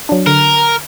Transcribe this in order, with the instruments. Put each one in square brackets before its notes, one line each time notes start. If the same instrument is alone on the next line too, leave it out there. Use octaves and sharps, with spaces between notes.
[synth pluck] F#3 D4
[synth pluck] D3 [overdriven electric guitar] A#4